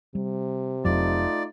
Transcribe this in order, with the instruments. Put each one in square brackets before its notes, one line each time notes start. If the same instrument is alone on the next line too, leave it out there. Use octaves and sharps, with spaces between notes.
[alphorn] C3 [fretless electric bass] G3
[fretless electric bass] F1 F2 F#3 [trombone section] A3 D#4 F4 [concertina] D5